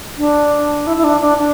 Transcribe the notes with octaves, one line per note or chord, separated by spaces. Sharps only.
D4
E4
E4
D4
D4
D4